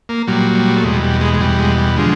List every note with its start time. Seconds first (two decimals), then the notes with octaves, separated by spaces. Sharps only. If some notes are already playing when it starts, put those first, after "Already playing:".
0.09 A#3
0.27 A#2 F#3 G3
0.55 G3
0.76 A3
0.84 E2 B2 G3 G#3
1.03 G3
1.21 G#3
1.34 G#3
1.40 E2 B2 G3
1.59 G#3
1.78 G3
1.97 D3 F3 G#3